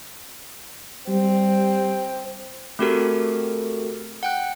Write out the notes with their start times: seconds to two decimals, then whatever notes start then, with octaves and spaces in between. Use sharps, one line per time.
1.08 G3 C4
2.79 A3 C4 F#4 G4 A4 A#4
4.23 F#5 G5 F#6